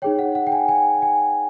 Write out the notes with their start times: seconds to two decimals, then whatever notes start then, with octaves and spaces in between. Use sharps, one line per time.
0.02 D#4 G#4 C#5 G5
0.19 F#5
0.35 F#5
0.47 G5
0.52 G#5
0.69 G#5
1.02 G#5